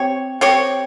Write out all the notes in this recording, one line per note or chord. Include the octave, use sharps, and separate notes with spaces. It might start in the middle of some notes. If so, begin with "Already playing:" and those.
Already playing: C4 G4 C#5
C4 G4 C#5